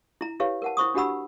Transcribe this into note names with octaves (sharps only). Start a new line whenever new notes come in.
E4 A#5
E4 G4 B4 C#5 F5
A#4 F#5 A5
E4 C5 C#6 D#6
D4 F#4 G4 F#5 B5 E6